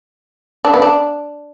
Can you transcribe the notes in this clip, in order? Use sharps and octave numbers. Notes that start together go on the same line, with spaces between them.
D4
B3
D4